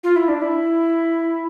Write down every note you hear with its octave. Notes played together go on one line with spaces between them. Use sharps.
F4
E4
D4
E4